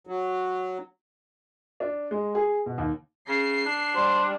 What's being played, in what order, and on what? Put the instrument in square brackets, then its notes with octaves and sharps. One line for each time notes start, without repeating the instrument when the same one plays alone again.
[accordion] F#3
[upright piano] D4
G#3
G#4
B2
D#2
[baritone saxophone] C#3 [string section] C7
[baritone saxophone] D4
[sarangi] G3 [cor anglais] C5